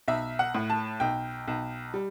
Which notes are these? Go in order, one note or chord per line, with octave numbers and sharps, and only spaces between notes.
B1 E5
F#5
A2
A5
B1 G5
B1
G3